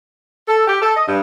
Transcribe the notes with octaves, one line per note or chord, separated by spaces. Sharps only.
A4
G4
A4
D#5
G2